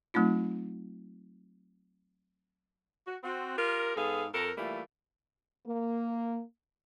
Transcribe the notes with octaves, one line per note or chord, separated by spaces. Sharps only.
F#3 A3 C4 D#4 F4
F#4
C4 F#4
F4 G4 A#4
G#2 B3 G#4 A4 F5
F2 A4 A#4
E3 G3 A3 A#3 F4
A#3